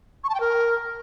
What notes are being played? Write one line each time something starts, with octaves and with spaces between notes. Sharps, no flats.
C#6
A5
G5
A#4